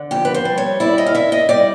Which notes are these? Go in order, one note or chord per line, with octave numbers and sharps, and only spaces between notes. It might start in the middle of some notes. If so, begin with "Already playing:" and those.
Already playing: D3
F2 G4
B4
C5
G3
C#5
E4 D5
D#5
F5
E4 E5
D#5
G3 D5